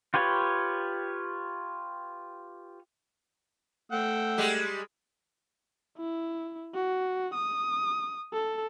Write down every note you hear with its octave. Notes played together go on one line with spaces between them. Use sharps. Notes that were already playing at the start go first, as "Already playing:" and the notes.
F4 G4 B4 C#5
A3 F#5 G5 E6
G3 G#3 G4
E4
F#4
D#6
A4